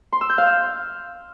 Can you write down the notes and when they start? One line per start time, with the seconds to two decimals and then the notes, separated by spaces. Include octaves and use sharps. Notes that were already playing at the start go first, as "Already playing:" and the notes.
0.12 C6
0.21 E6
0.29 G6
0.38 F5
0.46 E6